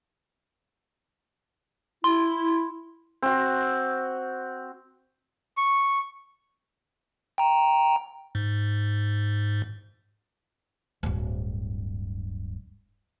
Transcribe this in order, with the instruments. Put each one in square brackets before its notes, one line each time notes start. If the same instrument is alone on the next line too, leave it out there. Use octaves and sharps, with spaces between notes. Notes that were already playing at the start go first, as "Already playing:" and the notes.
[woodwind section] E4 [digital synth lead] C6
[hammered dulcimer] C4 F#4
[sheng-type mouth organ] C#6
[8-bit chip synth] G5 A#5
G#2
[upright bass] D1 G2